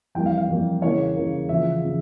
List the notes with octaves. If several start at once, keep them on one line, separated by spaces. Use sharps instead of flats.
F2 E3 G3 A#3 G5
F5
F5
F2 E3 G3 A#3
E2 C#3 E3 A#3 C#5
E2 C#3 E3 A#3
E2 C#3 F3 E5
C#3 F3